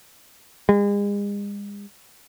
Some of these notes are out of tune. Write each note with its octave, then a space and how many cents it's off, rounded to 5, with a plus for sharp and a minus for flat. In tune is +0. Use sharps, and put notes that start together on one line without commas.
G#3 -40